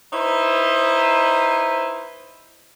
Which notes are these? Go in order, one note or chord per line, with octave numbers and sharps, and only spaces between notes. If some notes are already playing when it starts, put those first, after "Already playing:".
D#4 E4 B4 C5